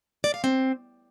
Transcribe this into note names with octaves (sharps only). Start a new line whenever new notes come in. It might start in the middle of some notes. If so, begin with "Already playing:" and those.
D5
F5
C4